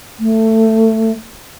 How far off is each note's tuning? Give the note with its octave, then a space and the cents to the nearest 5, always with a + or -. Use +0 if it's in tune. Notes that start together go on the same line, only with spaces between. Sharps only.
A3 +15